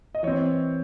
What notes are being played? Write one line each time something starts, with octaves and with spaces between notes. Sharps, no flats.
D#5
E3 C4 C#5